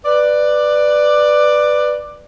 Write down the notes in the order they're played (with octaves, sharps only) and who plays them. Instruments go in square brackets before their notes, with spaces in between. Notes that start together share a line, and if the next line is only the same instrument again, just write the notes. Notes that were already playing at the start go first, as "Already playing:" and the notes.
[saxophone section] B4 D5